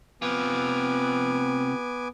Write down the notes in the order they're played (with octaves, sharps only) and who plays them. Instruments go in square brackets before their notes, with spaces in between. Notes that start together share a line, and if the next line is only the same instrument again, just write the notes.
[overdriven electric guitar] C3 F4 [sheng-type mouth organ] B3 G#5 D6